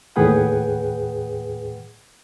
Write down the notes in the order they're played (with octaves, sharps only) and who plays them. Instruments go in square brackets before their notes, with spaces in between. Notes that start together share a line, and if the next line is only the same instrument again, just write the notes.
[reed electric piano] D#2 A2 G#4 B4 F#5 G5